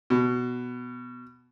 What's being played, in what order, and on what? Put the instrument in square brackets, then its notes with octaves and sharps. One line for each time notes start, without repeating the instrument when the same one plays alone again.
[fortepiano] B2